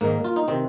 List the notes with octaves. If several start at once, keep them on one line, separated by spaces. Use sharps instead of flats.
G#2 D#3 A#3
F4
D#4
C3 D#3 C4